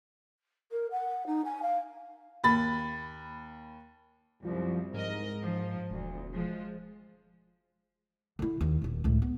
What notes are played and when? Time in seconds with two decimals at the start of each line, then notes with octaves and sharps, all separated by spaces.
0.71 A#4
0.91 F#5
1.26 D#4
1.44 G#5
1.62 F5
2.44 D#2 B5 A6
4.45 C2 F#2 F3
4.94 G#2 A#4 D#5
5.42 F3
5.91 E1 D2
6.32 F3 G#3
8.39 D3 E4
8.61 D#2
8.82 D#1 D#2
9.04 C#2 A2
9.22 B3